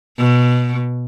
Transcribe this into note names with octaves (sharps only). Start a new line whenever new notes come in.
B2